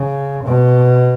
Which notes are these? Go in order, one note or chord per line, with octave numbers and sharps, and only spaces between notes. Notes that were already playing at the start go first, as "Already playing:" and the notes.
Already playing: C#3
B2